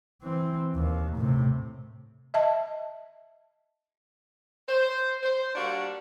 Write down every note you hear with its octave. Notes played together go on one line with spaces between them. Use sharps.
E3 C4
D#2
A2 C3
D#5 E5 A5
C5
C5
G3 A#3 D4 F#4